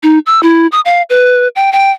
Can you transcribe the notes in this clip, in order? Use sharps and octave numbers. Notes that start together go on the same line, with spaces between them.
D#4
E6
E4
D#6
F5
B4
G5
G5